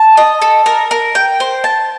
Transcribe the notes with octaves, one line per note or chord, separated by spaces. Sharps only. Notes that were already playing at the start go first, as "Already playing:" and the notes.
Already playing: A5
D#5
A4
A#4
A#4
G5
C5
A5